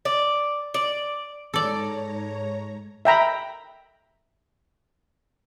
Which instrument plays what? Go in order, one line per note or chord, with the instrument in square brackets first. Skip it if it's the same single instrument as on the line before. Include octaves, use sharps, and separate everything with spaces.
[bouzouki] D5
D5
[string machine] G#2 C#5 A#5 [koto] A4 D5
[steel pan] E5 G5 A#5 B5